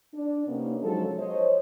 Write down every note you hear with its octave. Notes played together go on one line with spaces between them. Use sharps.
D4
C3 A#3 B3 C#4 D#4
F3 F#3 G#3 D#4 A4
C5 C#5 D#5